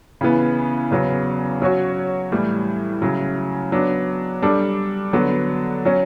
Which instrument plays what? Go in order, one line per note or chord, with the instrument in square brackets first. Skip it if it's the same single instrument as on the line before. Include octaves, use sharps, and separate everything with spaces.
[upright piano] C#3 E3 B3
E2 C#3 F#3 B3
F#3 C#4 F#4 C#5
A2 E3 G3
C#3 F#3 C#4 E4
F#3 B3 D4
G3 D4 A4
D3 F#3 B3 F#4
F#3 C#4